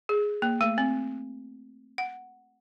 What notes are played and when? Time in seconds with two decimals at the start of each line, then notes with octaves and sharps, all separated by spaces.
0.09 G#4
0.42 A#3
0.61 A3
0.78 C4
1.98 F#5